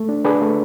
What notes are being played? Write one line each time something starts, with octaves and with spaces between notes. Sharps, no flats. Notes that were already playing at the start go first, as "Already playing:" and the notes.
Already playing: A3
D4
D4 G#4 B4
A3